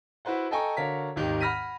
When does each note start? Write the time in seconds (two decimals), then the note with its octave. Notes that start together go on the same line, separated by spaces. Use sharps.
0.25 E4 F#4 B4 C5 F#5
0.51 A4 D#5 G5 G#5 A#5 C#6
0.77 D3 F#4 A#4 C#5 F5 B6
1.16 G#1 D#2 D#3 G4
1.41 F#5 B5 F6 A#6 B6 D#7